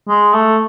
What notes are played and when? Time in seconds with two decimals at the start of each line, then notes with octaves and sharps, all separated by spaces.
0.08 G#3
0.33 A3